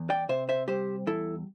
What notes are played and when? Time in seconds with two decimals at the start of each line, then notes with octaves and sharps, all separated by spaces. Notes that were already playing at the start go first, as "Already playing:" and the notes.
Already playing: E2
0.10 D5 G5
0.29 C3 C5 E5
0.49 C5 E5
0.68 G3 G4 C5
1.07 E2 E4 A4